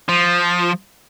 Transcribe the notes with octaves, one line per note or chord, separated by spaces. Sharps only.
F3